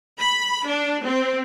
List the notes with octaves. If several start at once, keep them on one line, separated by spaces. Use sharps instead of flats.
B5
D4
C4